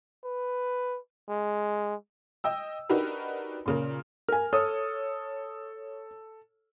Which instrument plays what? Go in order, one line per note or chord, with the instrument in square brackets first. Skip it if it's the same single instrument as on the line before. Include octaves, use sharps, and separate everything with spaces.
[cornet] B4
G#3
[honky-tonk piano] D#5 G5 E6
D4 D#4 F#4 G4 A#4 B4
A#2 C#3 A#4
[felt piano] A#4 G#5 [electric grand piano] F6
[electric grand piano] A4 [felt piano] C#5 D#6